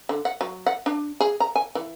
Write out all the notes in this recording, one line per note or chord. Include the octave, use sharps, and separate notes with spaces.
D3
F#5
F#3
F#5
D4
G#4
A#5
G#5
E3